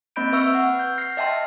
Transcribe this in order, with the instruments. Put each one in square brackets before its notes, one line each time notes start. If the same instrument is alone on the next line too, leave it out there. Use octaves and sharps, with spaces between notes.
[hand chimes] A#3 C4 D#5 B5 G6 D7
B4 E5 C#6 E6 F6
F#5
G6
F6 A#6 C7
D#5 E5 G5 A5 C6